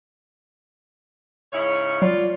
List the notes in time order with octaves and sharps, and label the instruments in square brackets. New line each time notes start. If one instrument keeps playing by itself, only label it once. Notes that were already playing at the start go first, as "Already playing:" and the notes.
[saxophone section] G#2 C#3 E4 [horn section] C#5
[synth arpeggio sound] F#3 [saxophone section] F4 [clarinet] D5